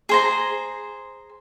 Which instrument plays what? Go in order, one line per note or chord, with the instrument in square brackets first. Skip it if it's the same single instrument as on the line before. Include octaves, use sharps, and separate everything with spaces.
[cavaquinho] G#4 C5 A#5